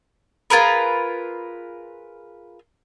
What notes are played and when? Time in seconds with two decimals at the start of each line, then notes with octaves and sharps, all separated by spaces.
0.50 F4 G#4 A#4 B4